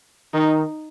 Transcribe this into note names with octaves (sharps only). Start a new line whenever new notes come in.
D#3 D#4